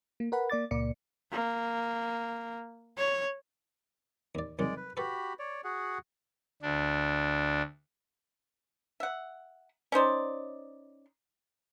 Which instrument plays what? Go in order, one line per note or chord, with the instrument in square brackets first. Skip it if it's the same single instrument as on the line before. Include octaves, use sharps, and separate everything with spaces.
[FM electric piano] A#3
A#4 B4 F#5 B5
A#3 D5 D6 A6
C#2 A#2 A#3 D5 C#7
[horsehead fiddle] A#3
C#5
[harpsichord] D#2 D5
[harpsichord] C2 D#3 F#3 [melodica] G#3 D5
[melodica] B4
[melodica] F#4 G4 B5 [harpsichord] A4 B4
[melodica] C#5 D5
F#4 G#4 F#5
[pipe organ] D2 D4
[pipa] E5 F#5
C#4 D#4 C5 D5